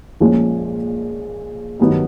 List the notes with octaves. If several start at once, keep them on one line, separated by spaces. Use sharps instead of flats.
A#1 A#2 F3 G#3 C#4
G2 D#3 F#3 B3 D#4